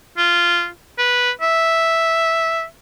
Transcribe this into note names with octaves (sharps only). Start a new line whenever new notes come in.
F4
B4
E5